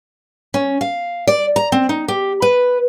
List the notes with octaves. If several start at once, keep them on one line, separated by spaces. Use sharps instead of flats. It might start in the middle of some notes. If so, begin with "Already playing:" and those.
C#4
F5
D5
A#5
C4
D#4
G4
B4